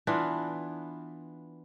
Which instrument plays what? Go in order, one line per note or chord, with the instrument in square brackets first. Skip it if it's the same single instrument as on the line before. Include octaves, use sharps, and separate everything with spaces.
[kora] E3 B3 D4 F4